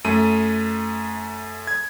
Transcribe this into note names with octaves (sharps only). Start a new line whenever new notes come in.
F#2 A3 D#7
G#6